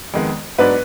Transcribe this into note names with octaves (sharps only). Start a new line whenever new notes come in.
F2 D#3 G#3 B3
G#2 F#3 B3 D4 B4